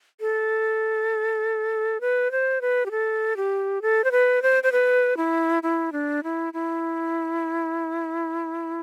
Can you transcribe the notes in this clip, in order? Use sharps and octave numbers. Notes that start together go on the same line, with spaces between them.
A4
B4
C5
B4
G4
A4
G4
A4
C5
B4
C5
C5
B4
E4
E4
D4
E4
E4